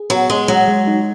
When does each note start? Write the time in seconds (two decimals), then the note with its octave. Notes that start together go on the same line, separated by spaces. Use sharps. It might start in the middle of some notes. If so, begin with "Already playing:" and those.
Already playing: G#4
0.10 F#3 B3
0.30 G#3 G#4
0.48 F#3 G#3
0.68 G#3
0.87 D#4